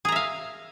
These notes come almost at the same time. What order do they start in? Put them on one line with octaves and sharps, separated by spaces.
G#4 A#5 E5 F5